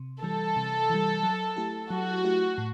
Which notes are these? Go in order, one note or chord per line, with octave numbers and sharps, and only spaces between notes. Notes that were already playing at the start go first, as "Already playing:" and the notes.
Already playing: C3
E3 G3 A4
C3
E3 G3
F#3
A3 E4 G4
F#3 F#4
A3 E4 G4
A2